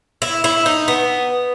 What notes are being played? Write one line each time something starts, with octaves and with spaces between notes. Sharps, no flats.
E4
E4
D#4
B3